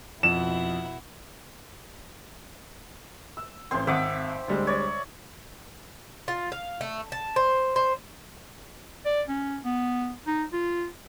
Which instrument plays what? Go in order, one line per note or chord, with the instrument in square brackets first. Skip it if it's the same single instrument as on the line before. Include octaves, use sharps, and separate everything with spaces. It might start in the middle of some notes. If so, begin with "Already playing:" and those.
[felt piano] F2 [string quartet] B2 E4 F#5 [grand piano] E7
[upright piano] E6
[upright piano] A1 C6 [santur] C4 C5
[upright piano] G#1 F#5 D#6 [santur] E5 D6
[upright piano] D2 G3 G#3
[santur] C#5 D5
[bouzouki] F4
F5
A3
A5
C5
C5
[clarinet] D5
C#4
B3
D#4
F4